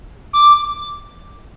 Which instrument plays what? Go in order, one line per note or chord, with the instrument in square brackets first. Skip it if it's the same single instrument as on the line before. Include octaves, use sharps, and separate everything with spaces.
[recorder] D6